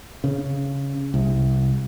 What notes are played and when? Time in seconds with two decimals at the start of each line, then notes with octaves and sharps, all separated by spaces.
0.24 C#3
1.14 C2